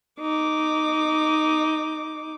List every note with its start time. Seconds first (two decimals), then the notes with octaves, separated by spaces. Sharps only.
0.20 D#4 D6